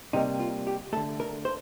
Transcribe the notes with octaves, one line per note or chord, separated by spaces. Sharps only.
C3 G3 A#3 D#4
F4
G4
D3 A3 A4
A#4
C5